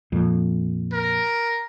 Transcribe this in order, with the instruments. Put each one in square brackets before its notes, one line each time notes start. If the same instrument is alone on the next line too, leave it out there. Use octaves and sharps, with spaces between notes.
[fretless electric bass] F2 A#2
[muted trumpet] A#4